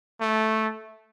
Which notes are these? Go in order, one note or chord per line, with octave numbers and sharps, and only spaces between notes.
A3